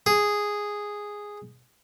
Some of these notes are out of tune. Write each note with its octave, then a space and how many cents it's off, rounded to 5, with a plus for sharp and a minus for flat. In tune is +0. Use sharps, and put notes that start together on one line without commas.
G#4 -5